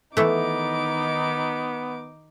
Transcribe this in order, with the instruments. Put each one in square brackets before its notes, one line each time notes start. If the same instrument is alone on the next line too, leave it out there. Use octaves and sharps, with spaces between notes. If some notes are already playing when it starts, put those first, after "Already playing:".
[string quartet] D#3 D#4 D6 [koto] E3 A3 [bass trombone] B3